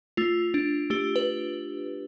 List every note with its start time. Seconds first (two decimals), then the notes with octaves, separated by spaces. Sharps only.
0.17 A3 F4
0.54 D4
0.90 A3 G4
1.16 B4